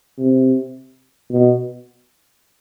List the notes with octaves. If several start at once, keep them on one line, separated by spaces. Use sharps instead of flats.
C3
B2